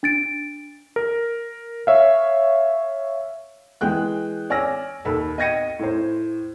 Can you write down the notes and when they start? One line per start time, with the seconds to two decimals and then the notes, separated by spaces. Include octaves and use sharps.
0.03 D4 A6 D7
0.96 A#4
1.87 C#5 E5 F5
3.81 E3 G#3 G5 F#6
4.50 C#5 D5 G#5 E6 F6 A#6
5.05 D#2 A4 B5 E6
5.38 D#5 G5 G#6 A#6 C#7 D#7
5.79 A2 C5